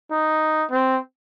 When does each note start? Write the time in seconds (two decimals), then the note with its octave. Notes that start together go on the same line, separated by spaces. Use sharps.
0.11 D#4
0.71 C4